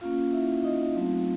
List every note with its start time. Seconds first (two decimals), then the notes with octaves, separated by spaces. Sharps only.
0.01 A#3 C#4 F4 F5
0.33 E4 E5
0.64 D#4 D#5
0.95 F#3 A3 C4 D#4 F4 F5